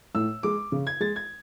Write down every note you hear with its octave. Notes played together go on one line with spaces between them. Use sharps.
A2 E6
G#3 D6
C#3
G#6
G#3 A6
G#6